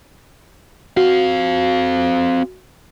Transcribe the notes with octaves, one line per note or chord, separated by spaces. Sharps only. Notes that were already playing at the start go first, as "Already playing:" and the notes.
C4 F#4 F5